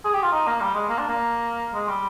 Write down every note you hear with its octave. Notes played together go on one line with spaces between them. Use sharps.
G#4
G4
F4
D#4
A#3
G3
G#3
A#3
D4
A#3
G#3
G3